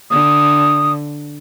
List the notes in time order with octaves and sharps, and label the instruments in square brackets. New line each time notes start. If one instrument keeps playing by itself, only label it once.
[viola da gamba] D3 [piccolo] D#6